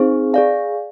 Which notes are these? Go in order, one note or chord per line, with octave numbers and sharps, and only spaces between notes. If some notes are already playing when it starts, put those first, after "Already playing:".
Already playing: C4 D#4 G#4 C5
G#4 D5 F5 G#5